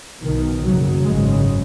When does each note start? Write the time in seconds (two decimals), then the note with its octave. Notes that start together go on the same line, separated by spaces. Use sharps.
0.22 B1 B2 D#3
0.63 F#1 F#2 C#3 F#3
1.04 G#1 F#2 C#3 G#3